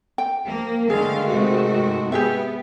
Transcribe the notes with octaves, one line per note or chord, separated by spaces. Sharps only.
G5
F3 A#3
D3 D#3 G#3 A3 G#4 F5
G#2 C3 F#4
B3 G4 G#4 E5 G5